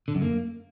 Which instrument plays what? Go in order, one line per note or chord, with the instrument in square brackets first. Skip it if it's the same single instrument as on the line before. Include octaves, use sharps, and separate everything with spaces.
[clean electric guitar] D3
F#2
A#3